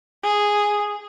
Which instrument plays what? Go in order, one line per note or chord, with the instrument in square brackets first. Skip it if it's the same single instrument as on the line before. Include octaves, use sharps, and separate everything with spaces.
[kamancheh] G#4